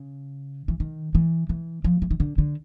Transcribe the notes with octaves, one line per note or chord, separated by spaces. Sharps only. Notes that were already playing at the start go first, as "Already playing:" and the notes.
Already playing: C#3
E3
D#3
E3
E3
F3
E3
D#3
D3
D3